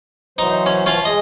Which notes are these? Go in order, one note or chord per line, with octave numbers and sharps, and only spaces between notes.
E3 F#3 D#4 C5
C#4
E3 F3 C#4 F4
G#3 D#5